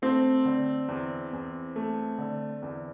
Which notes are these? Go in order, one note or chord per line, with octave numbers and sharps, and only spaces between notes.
A3 C4
D3
E2
E2
A3
D3
E2